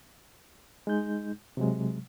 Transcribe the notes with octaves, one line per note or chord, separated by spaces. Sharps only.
G#3 D#4 G6
C3 F#3 G#3